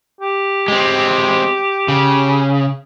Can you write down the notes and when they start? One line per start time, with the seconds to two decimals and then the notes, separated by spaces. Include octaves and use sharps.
0.21 G4
0.68 G#3 C4
1.88 C#3